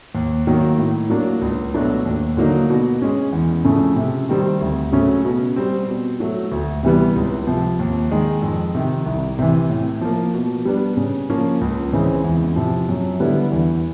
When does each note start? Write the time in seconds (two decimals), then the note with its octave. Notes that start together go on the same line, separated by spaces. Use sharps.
0.15 D#2
0.47 D#3 F#3 A#3
0.78 A2
1.10 F#3 A#3 D4
1.41 C#2
1.74 B2 F#3 A3 D4
2.06 D#2
2.37 D3 F#3 A#3 D#4
2.70 B2
3.02 G#3 C#4
3.33 E2
3.64 C#3 F3 A3 C#4
3.96 C3
4.29 D#3 G3 C4
4.61 D2
4.92 C#3 F#3 A3 C#4
5.25 B2
5.56 G3 C4
5.88 B2
6.20 F#3 A3
6.52 D2
6.83 C3 E3 G3 B3
7.16 C#2
7.47 C3 F3
7.79 D#2
8.11 D#3 G#3
8.42 F2
8.75 C3 D#3
9.06 C2
9.39 C3 E3
9.69 A2
10.01 F3 A#3
10.34 B2
10.65 G3 B3 D4
10.97 C#3
11.30 F3 A#3 C#4
11.61 C#2
11.93 C#3 E3 G#3 C4
12.24 E2
12.56 C3 F3
12.89 F#2
13.20 D3 G3 B3 E4
13.52 E2